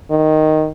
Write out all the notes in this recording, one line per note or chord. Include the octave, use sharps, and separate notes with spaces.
D#3